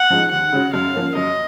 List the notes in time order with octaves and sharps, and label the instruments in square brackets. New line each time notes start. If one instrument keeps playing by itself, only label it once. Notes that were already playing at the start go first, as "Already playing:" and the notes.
Already playing: [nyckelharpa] F#5
[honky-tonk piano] F3 G#3 D#4
[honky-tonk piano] D#2 [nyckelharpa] F#5
[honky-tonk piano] C#3 G#3 C#4 F#4
[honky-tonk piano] F#2 [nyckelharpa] F5
[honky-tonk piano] F3 A#3 C#4
[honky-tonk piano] F#2 [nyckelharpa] D#5